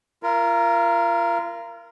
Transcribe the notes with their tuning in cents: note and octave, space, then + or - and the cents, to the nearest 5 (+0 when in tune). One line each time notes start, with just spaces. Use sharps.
F4 -35 A#4 +0